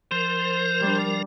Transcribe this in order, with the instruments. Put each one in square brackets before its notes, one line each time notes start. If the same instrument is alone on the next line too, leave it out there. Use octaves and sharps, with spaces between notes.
[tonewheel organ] F3 A#4 [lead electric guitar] C5
[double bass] G3 D4